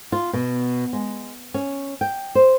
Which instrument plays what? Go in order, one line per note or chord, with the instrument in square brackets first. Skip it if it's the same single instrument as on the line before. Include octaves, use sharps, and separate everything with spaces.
[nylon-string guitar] F4
B2
G#3
C#4
G5
C5